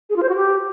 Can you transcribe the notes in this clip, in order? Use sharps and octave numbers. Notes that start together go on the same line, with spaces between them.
G#4
F4
C5
F#4
G4